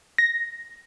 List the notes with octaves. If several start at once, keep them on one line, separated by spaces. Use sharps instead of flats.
A#6